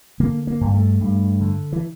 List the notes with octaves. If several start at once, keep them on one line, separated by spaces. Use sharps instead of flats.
D3 A#3
A#3
G2
A3
G2
D3
E3